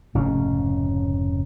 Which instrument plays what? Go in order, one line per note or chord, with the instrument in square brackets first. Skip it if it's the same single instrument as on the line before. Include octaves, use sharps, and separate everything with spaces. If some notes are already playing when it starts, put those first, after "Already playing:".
[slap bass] F1 G#2 C#3 C#4